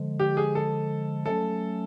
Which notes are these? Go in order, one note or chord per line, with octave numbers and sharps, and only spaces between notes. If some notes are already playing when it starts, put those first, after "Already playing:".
Already playing: D3 F3 G#3
G4
G#4
A4
F#3 A3 C#4 A4